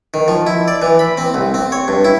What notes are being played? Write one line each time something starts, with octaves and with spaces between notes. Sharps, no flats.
D#3
F3
E4
D5
E3
B5
C4
C2
C4
C#5
G2
E4